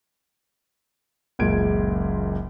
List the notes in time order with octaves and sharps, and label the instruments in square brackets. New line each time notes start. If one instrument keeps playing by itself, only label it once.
[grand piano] F#1 C#2 A#2 G#6 D7